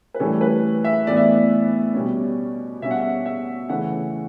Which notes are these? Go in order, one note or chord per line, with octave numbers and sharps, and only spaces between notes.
B4
A2 E3 G3 C#4 A4
B4
E5
A2 E3 B3 D5
E5
D5
B2 G3 C#4
B2 G3 C#4 E5
F#5
E5
E5
C#3 E3 A3 C#4 F#5